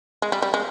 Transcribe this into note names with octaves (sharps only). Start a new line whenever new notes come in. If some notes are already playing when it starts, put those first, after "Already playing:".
G#3
G3
G3
G#3